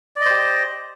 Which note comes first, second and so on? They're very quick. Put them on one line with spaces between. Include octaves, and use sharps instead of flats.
D5 D#5 C5 G4